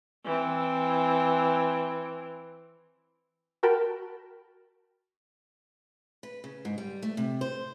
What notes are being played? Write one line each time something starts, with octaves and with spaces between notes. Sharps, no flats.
E3 C4
F#4 A#4 G5 A5 B5
B4
C#3
G#2
G3
A3
C3
C5